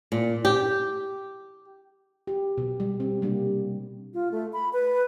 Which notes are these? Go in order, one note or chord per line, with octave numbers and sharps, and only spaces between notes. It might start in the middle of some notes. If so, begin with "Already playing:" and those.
A#2
G4
G4
B2
G3
C4
C3 G3 A#3 D4 G4
F4
A3
B5
B4